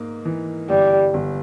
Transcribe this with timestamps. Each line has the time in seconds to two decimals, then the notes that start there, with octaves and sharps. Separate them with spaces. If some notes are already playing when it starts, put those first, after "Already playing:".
Already playing: G#2 A#3
0.25 E3
0.69 G1 G3
1.14 G1